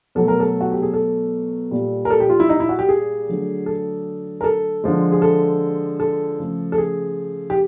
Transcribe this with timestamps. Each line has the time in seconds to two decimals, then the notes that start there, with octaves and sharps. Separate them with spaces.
0.15 B2 F#3 A3 A4
0.28 A#4
0.40 A4
0.61 F#4
0.72 G4
0.82 G#4
0.94 A4
1.71 A#2 G3
2.05 A#4
2.10 A4
2.20 G4
2.30 F4
2.40 E4
2.49 D#4
2.60 E4
2.69 F#4
2.79 G4
2.89 G#4
3.28 D3 F#3 A3
3.66 A4
4.41 A#4
4.44 A4
4.84 D3 F3 G#3
5.12 G#4
5.22 A4
6.00 A4
6.39 C#3 F3 A3
6.72 A4
6.78 G#4
7.50 G4